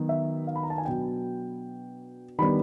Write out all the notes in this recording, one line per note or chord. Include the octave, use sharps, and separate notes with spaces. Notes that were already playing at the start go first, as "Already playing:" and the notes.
Already playing: D#3 F#3 B3
E5
F5
B5
A#5
A5
G#5
B2 F#3 B3 D4 G5
D#3 G3 B3 D4 B5